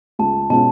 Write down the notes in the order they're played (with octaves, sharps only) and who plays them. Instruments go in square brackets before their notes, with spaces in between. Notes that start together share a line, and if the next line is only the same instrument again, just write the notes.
[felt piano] C#2 [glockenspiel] A5
[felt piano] B2 G#3 C#4 F4 [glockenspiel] A5